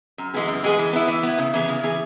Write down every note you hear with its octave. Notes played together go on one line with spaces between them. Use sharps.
F#2
E3 G#3 B3 G#4
F#2
E3 G#3 B3 G#4
E3
B3 E4
E3
B3 E4
C#3
E3 B3 G#4
C#3
E3 B3 G#4